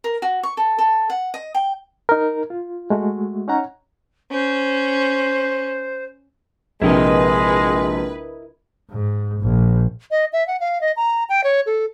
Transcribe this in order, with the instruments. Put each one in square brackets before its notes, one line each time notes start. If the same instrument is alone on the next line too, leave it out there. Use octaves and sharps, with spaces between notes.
[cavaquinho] A#4
F#4
C#6
A4
A4
F#5
D#5
G5
[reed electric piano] D#4 A#4
F4
G#3 A3 F#4
C#4 D#4 C#5 F#5 A#5
[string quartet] C#4 [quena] C5
[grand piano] A#1 C3 [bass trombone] G#3 [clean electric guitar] E4 A#4 D#5 [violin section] B4
[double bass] G#2
A#1
[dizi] D#5
E5
F#5
F5
D#5
A#5
G5
C#5
A4